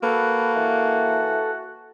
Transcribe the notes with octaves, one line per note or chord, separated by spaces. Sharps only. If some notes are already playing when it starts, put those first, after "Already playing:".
A#3 F#4 A4 B4
E3